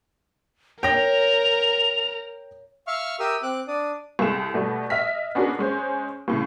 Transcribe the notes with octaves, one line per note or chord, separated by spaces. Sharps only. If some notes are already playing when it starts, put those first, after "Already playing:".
A#4 C#5 G5 A#6 F7
E5 F5 C#6 F6
G4 A#4 E5 D#6 E6
C4 D6 F#6
D4 D5 D#6
C2 G#3 A4 E7
B2 G3 A3
D#5 E5 F6 B6
B3 C#4 D4 F#4 G#4 A#4
G#3 C#4 C5
C2 A2 C#3